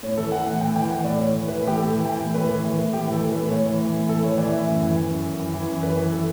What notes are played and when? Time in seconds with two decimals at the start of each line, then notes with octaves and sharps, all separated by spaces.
0.03 A2 C#5
0.17 E3 A4
0.32 E3 F#5
0.46 A2 F#5
0.61 A2 G5
0.76 E3 G5
0.90 E3 F#5
1.04 A2 D5
1.19 A2 C#5
1.34 E3
1.48 E3 B4
1.63 A2 G4
1.77 A2 A4
1.91 E3
2.06 E3 G5
2.21 A2
2.34 A2 B4
2.50 E3
2.64 E3 B4
2.78 A2
2.93 A2 G4
3.07 E3
3.13 A4
3.22 E3
3.32 B4
3.37 A2
3.51 A2 C#5
3.66 E3
3.80 E3
3.94 A2
4.08 A2 A4
4.23 E3 C#5
4.38 E3 D5
4.52 A2 E5
4.67 F#2
4.82 E3
4.96 E3
5.11 F#2
5.25 F#2
5.40 E3
5.54 E3
5.68 F#2
5.83 F#2 B4
5.97 E3
6.12 E3 A4